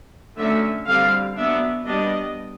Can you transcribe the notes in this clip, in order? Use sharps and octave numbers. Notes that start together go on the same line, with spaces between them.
D3 F#3 A3 C#4 E5
D3 G3 C4 F5
F#3 B3 D4 E5
G3 B3 D4 D#5